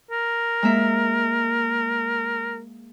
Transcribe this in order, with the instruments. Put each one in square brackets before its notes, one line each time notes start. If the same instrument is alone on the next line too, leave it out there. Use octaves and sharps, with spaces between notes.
[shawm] A#4
[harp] G#3 A#3 E5